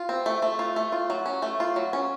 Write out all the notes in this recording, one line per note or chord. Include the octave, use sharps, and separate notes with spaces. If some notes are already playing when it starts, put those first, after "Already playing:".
Already playing: F4
C4
A3
A3
F4
A3
F4
F#3
C#4
A3
F4
F#3
C#4